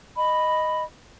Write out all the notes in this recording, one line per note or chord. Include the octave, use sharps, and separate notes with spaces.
D#5 B5